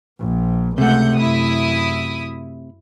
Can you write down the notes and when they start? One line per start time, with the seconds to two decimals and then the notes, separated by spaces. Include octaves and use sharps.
0.21 A#1
0.78 C#2 C3 A3 F#5 G6
1.15 F#2 E4 D#6